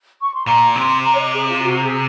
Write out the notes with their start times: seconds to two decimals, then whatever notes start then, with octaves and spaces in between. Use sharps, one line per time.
0.21 C#6
0.34 C6
0.46 A#2 A#5
0.76 C3 C6
1.04 A#5
1.15 C#5
1.20 D#5
1.34 G#4
1.49 F4
1.62 F#4
1.82 G#4